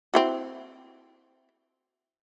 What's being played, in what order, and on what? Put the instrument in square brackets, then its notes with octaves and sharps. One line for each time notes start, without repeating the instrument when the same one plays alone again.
[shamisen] C4 E4 F#4